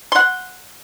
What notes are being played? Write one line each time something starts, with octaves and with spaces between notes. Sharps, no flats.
F#5 C6